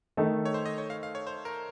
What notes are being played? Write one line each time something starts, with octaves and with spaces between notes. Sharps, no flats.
D#3 A3 D#4 A4
C#5
C5
D#5
C#5
F5
F5
C#5
C5
A#4